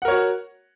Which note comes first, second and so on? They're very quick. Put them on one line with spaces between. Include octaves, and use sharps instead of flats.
F#5 A#4 C#5 F#4